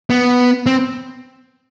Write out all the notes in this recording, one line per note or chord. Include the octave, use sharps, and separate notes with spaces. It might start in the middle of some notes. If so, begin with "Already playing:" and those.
B3
C4